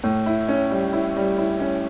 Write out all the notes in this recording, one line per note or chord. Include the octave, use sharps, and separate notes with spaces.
A2
E4
C#4
G3
E4
G3
E4
C#4